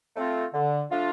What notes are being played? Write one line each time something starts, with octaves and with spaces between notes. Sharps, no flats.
A3 C4 F4
D3
F3 A3 D4 F4